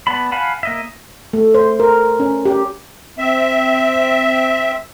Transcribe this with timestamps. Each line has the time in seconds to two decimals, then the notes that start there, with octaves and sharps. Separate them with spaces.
0.07 B3 D5 A5 B5
0.32 F5 F#5 G#5 A5 B5
0.63 A#3 D#5 E5
1.33 A3
1.54 C5
1.80 A#4
2.20 C#4
2.45 G4
3.18 C4 E5